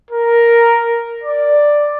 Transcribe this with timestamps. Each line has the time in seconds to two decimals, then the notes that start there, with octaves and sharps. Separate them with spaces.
0.11 A#4
1.24 D5